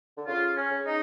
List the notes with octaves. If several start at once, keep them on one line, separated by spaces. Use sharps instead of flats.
D3
C#3 F4
C#4
C#3
D#4